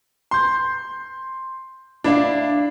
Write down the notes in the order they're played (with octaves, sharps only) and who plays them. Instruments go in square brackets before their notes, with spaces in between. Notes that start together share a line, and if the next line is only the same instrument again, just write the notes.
[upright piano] C6 G6
[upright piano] D4 [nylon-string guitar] E4 D5 F5